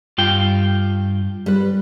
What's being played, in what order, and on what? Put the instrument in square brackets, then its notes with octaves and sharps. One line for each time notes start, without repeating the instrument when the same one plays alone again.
[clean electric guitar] G2 F4 G5
[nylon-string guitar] G3 B4